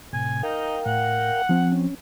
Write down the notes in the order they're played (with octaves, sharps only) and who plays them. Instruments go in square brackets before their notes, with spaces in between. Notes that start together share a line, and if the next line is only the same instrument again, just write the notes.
[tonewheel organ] A2 C3 [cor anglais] G#5
[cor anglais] D#4 [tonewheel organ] A#4 F5 G5
[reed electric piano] A2 [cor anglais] F#5
[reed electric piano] F3 C4
[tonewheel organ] C#4